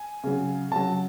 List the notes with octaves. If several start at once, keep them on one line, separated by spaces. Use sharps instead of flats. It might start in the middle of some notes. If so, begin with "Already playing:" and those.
Already playing: G#5
C#3 F#3
C#3 F#3 A5